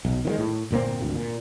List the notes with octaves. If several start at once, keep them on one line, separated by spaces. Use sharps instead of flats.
B1
D#3 F3 G#3
A2
G1 A#2 A#3 C4
G#1 D2
A#2